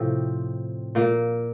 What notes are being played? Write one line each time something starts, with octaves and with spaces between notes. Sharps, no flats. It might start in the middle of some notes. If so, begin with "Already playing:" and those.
Already playing: A2 C3 F3 C4
A#2 A#3